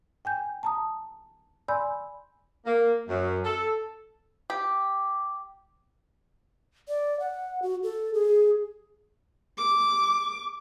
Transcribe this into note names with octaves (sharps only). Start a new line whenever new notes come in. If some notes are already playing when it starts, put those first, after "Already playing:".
G5 G#5 G6
A5 A#5 D#6
D5 G#5 B5 C6 E6 G6
A#3
F#2
A4
G4
D5
F#5
F#4
A4
G#4
D6